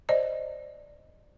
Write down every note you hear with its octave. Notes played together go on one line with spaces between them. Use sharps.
C5 D5 D#5